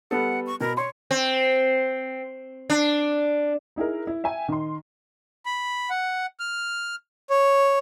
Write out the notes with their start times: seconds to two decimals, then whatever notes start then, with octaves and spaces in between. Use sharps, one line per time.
0.11 G3 B3 A4 F#5
0.47 C#6
0.61 B2 A#4 B5
0.77 C#5 C6
1.11 C4
2.70 D4
3.76 D#4 E4 G#4 A#4
4.07 E4
4.24 E5 G5 G#5
4.48 D#3 C6
5.46 B5
5.90 F#5
6.40 F6
7.30 C#5